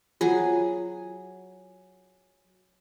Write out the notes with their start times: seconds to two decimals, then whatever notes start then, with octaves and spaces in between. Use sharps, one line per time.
0.21 F#3 F4 G#4